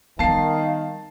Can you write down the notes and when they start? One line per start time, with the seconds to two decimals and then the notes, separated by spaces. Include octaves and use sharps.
0.19 D#3 G3 B3 F5 A5 C7